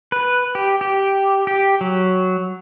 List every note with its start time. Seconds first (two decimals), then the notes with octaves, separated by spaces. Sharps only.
0.12 B4
0.55 G4
0.81 G4
1.47 G4
1.81 F#3